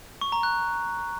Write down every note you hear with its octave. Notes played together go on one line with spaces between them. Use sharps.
C#6
A#5
F#6